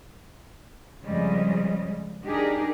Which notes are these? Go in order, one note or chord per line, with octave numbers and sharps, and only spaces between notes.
F2 C#3 G3 G#3 D#5
D4 D#4 G4 G#4 A#4